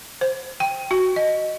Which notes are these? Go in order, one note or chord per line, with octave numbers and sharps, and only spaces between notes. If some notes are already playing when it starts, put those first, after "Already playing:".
C5
G5
F#4
D#5